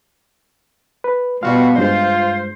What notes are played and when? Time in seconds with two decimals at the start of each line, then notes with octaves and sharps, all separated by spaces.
1.04 B4
1.43 B2 G3 F4 F#4 F5
1.78 G2 G#3 F4 C5